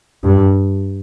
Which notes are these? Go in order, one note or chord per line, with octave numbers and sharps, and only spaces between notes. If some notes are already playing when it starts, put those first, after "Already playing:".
G2